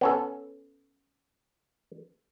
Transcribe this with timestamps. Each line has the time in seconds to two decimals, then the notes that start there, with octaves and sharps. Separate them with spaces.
0.01 B3 C#4 A4